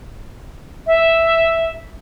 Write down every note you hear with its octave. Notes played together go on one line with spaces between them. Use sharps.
E5